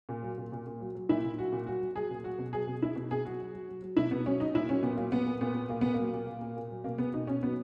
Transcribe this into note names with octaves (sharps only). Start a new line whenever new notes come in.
A#2
F#3
A#2
A#2
A#2
F#3
F#3
A#2 E4
A#2
F#3 F#4
A#2
F#3 F#4
F#3
F#3 G#4
A#2
F#3 F#4
B2
F#3 G#4
B2
B2 E4
B2
B2 G#4
F#3 F#4
F#3
F#3
F#3
F#3
B2 E4
B2 B3
F#3 C#4
F#3 D#4
A#2 E4
F#3 C#4
A#2 B3
F#3 A#3
A#2 B3
A#2
A#2 B3
A#2
A#2 A#3
A#2 B3
F#3 A#3
A#2
A#2
A#2
A#2
F#3
B2 A#3
B2 B3
B2 D#4
B2 C#4
F#3 B3